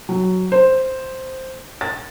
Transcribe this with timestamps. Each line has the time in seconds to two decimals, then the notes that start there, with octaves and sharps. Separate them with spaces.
0.09 F#3
0.52 C5
1.81 A6